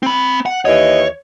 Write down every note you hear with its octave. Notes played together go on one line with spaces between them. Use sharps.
C4 B5
F#5
D#2 E3 C#5 D#5